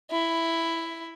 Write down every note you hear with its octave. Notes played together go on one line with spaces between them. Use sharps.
E4